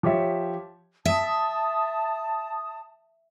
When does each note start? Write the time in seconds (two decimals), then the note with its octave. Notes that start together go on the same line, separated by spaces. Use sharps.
0.03 F3 G4 C#5 E5
1.05 E5 A5 D#6